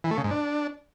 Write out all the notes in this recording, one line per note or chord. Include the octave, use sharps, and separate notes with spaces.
E3
A3
C#3
G#2
D4